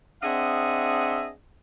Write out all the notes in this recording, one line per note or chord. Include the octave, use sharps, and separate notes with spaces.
C4 D4 G#4 D#5 E5 F#5